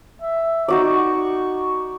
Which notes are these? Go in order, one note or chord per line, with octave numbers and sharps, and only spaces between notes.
E5
D#4 F#4 D5 C#6